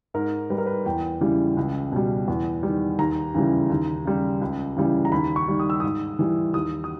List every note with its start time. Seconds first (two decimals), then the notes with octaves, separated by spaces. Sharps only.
0.14 G#2 A#4
0.50 G3 B4
0.58 A#4
0.66 B4
0.86 E2 G5
1.21 C#3 E3 G3
1.57 C#2
1.92 B2 G3
2.28 E2
2.63 D#3 G3
2.99 D#2 A#5
3.34 C#3 E3 G3
3.70 D#2
4.05 C#3 G3
4.41 C#2
4.77 C#3 E3 G3
5.05 A#5
5.12 D#2 B5
5.36 C#6
5.48 D#3 G3
5.60 D#6
5.70 E6
5.80 G#2 D#6
6.19 E3 G3
6.54 D#2 D#6
6.84 D#6